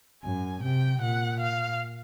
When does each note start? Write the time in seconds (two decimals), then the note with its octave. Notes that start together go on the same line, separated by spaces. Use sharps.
0.23 F#2 G#5
0.62 C3 G5
1.01 A#2 F#5
1.40 F5